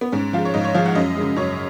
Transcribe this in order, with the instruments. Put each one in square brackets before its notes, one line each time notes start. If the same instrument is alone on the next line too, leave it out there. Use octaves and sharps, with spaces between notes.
[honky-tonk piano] B3
G#2 C#4
F3 F4
G#3
C#5
G#2 D#5
C#5
F3 G#3 F5
F#5
F#2 D#5
C#3 G#3
F#2 C#5